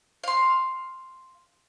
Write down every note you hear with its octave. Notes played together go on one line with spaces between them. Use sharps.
F5 C6